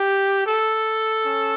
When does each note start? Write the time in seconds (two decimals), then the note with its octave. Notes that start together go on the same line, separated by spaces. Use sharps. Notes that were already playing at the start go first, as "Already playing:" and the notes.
Already playing: G4
0.45 A4
1.26 C#4